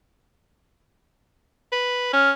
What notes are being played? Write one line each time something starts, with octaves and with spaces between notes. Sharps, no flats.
B4
C#4 F6